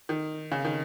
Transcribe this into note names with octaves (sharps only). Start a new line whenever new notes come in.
D#3
C#3
D#3